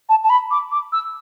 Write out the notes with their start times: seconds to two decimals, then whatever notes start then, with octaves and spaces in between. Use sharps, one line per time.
0.09 A5
0.24 A5
0.30 B5
0.51 D6
0.72 D6
0.93 E6